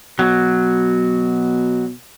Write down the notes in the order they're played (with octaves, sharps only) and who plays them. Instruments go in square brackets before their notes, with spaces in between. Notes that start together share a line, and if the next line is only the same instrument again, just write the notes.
[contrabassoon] B2 [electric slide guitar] F#3